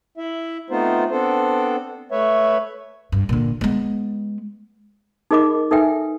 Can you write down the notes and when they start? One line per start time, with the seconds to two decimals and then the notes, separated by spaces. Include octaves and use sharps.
0.17 E4 E5
0.70 A3 B3 C4 D#4 F4 C5
1.11 B3 C4 D4 A4 C5
2.12 A3 B4 C#5 E5
3.12 G2
3.29 A#2 D3
3.61 G#3 B3
5.31 D#4 G#4 A#4 D#5 B5 D6
5.71 D#4 A4 B4 E5 G5 G#5